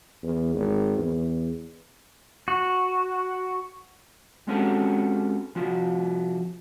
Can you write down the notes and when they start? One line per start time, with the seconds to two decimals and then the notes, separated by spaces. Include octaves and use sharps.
0.23 E2
0.54 G#1
0.98 E2
2.48 F#4
4.47 G#3 C4 C#4 F#4 G4 A4
5.55 C2 F3 F4 F#4